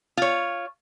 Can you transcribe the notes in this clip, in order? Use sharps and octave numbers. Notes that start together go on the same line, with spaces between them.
F4 C#5